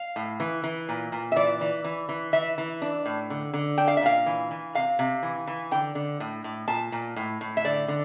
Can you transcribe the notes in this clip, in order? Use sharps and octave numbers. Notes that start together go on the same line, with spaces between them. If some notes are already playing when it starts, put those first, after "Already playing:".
Already playing: F5
A2
E3
E3
A#2
A#2
E5
E3 D5
E3
E3
E3
E3 E5
E3
D4
A2
D3
D3
D4 G5
F5
E5
A#2 F5
E3
E3
C3 F5
C3
E3
E3
D3 G5
D3
A2
A2
A#2 A5
A#2
A2
A2
E5
D3 D5
D3